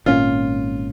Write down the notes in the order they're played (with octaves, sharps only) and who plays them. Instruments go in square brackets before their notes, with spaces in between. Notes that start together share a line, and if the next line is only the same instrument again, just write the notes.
[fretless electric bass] G#1 A#2 C#4 [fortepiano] F4